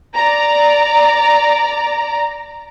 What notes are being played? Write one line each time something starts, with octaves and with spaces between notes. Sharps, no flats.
D5 A#5